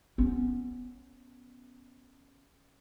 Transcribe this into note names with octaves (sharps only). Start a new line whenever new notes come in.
B3 C#4